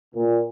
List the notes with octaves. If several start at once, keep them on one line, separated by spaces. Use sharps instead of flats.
A#2